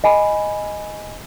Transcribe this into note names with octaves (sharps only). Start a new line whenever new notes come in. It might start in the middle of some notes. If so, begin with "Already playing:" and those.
D#5 G#5 B5